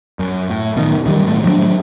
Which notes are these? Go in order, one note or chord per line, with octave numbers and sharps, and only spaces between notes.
F#2
A2
F#2 B2 D#3
F#2 D#3 F3 G3
F#2 A2 A3
F3 F#3 A3 D4